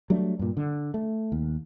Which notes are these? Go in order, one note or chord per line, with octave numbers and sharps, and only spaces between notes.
F#3 G3 A3 D4
G2 A#2
D3
A3
D#2